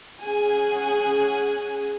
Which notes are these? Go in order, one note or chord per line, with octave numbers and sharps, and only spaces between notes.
C#4 G#4 F#5 G#5